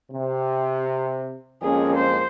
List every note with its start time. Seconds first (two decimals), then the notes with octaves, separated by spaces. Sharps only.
0.11 C3
1.62 F2 G#3 A#3 C#4 G#4
1.97 C5